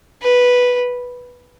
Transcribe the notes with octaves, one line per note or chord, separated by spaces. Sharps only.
B4